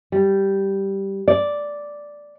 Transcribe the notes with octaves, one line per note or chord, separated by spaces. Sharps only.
G3
D5